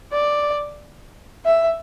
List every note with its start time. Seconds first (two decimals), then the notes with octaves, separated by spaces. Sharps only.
0.12 D5
1.46 E5